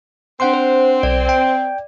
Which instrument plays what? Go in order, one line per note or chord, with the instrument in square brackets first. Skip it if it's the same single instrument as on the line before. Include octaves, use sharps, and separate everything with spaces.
[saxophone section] C4 [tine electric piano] D4 F#5 C6
[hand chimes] C5
[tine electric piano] B1 [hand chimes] D5
[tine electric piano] G5